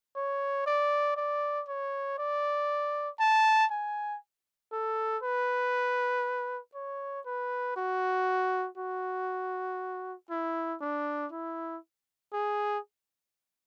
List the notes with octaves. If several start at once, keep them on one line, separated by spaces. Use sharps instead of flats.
C#5
D5
D5
C#5
D5
A5
G#5
A4
B4
C#5
B4
F#4
F#4
E4
D4
E4
G#4